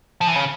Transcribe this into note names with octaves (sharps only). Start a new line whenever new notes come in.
F3
E3
C#3